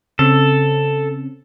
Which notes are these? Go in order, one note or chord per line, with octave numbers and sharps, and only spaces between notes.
C#3 C4 C#4 A4